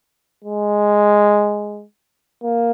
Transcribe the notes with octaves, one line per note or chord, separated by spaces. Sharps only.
G#3
A#3